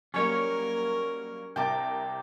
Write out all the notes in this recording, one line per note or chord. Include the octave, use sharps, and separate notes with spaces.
F#3 G3 A#3 C#4 A#4 C#5
C2 C3 A#4 G5 A5 D6